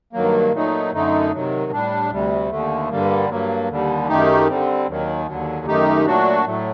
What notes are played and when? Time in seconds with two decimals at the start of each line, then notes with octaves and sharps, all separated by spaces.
0.13 G2 D#3 F#3 A#3
0.53 A#2 F#3 A3 D#4
0.92 F#2 D3 A3 D#4
1.32 C3 D#3 F#3
1.72 A2 G3 D4
2.11 D2 C3 G3
2.50 D#2 D3 A3
2.90 G2 D3 G3 A#3
3.29 G2 F#3 A#3
3.68 D#2 D3 G3
4.08 F#2 D#3 A3 D#4 G4
4.48 D3 G3 C4
4.88 D#2 D#3 F#3
5.27 D#2 D3 F#3
5.66 F#2 D#3 A3 D#4 G4
6.05 A#2 F#3 A3 D4 F#4
6.45 A2 F#3 A3